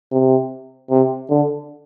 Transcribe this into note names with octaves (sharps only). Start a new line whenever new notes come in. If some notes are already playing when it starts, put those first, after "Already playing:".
C3
C3
D3